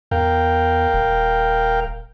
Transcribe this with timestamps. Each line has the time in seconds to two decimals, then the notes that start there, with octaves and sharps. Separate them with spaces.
0.11 E2 A#4 F5 G5
0.94 D#1